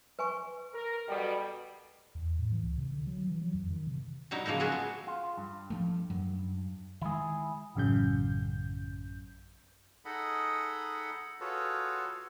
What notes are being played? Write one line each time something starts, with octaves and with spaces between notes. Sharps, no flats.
B4 G#5 C#6
A#4
B2 G3 A4 G5
E2
A2
E3
C#2
C3
D3
F#3
E3
F#3
F2
D#3
C3
F#3 G3 D#4 E4
C#3 F3 F#3 A#3 D#4
G#3 B3 F#4 G#4 E5
B3
F4
G2
F3 G3 A3
F#2 F#3
D#3 G#3 E4 G#4
A1 F#2 C#3 G6
D#4 G#4 A4 D#5 F#5 B5
F4 F#4 G#4 A4 B4 C#5